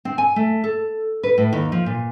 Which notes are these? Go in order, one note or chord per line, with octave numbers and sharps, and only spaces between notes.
C4
G#5
A3
A4
B4
A2
D#2
F3
A#2